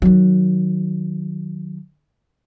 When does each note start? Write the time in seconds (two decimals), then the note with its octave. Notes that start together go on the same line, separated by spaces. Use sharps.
0.02 D#3 F#3